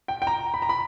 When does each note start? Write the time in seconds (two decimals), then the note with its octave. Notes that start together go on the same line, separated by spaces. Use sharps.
0.08 G5
0.22 G5
0.27 A#5
0.54 B5
0.62 A#5
0.69 B5